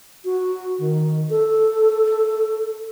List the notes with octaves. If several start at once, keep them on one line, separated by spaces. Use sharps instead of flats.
F#4
D#3
A4